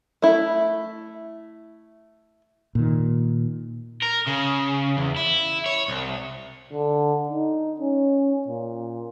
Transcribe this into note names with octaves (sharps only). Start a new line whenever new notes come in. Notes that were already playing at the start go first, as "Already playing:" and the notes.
A3 E4
A#2 D#3
A#4
C#3
E2
E4
C#5
C2
D3
D#4
C#4
A#2